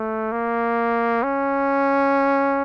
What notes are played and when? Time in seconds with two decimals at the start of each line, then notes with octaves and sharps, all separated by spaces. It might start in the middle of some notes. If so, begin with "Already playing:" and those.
Already playing: A3
0.32 A#3
1.23 C#4